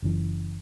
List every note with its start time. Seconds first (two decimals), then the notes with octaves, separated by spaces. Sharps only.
0.02 F#1 F#2 E3